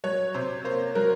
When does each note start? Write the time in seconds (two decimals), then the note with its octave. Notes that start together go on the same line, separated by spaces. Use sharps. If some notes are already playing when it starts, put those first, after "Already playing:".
0.04 F#3 C#5
0.34 C3 C5
0.64 A#3 C5
0.95 F#3 A#4